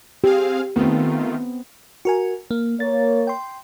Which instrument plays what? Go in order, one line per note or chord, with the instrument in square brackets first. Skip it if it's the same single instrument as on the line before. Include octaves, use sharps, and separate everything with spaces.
[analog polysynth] C4 G#4 F5 [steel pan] G4
[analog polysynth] D#3 A3 F4 [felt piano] B3 C4
[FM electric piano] F#4 A#4 G#5
A#3
[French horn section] A#3 C#5 [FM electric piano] A6
[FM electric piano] G5 C6